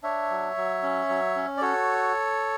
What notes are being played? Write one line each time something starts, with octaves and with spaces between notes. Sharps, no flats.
D4 C#5 E5
F#3
F#3
C#4
F#3
C#4
D5
F#4 A4 C#5